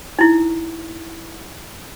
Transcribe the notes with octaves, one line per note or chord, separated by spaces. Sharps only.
D#4 E4